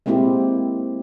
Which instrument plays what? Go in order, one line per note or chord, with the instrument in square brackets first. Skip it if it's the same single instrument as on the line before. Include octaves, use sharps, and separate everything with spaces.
[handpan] G#3 A#3 C4 E4 G4